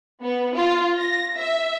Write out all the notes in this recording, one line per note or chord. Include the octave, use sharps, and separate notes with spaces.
B3
F4
A#6
E5